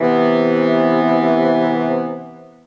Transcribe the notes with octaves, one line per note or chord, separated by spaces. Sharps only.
C3 E3 B3